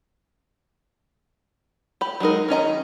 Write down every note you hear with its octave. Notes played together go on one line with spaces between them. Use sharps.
G4 B5
F#3 G#3 D#4 A#4
D#3 C#4 D#5 A#5